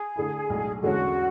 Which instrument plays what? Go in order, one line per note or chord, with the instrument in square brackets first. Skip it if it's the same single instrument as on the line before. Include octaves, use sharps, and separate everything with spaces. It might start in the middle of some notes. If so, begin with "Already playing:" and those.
Already playing: [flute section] G#4
[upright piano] D3 A3 E4
B1 A2 G#3 D4
[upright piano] E2 D3 G#3 C#4 [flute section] F#4